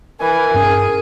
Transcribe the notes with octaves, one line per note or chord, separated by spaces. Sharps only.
E3 A#4 G#5
G2 C#4 G#4